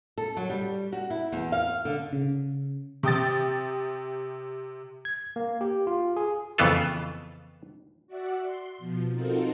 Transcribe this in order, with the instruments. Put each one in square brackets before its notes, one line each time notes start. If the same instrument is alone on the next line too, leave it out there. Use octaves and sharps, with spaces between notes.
[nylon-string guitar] A4
F#3
G3
F#4
E4
E2
F5
D3
[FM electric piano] C#3
[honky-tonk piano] C3 G5 D#6 A6
[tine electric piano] G#6
A#3
G4
F4
G#4
[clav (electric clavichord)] F2 C#3 E3 B3 F4 A4
[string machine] F#4 D5 E5 F#5
C6
B2 F3
C4 D#4 F4 F#4 A4 A#4